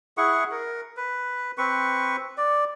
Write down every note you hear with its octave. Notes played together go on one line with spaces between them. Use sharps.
E4 G#4 F#5 C#6
A#4
B4
C4 B4 C#6
D5